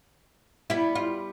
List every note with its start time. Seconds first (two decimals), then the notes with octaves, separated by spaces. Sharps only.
0.70 G3 B3 E4
0.95 F4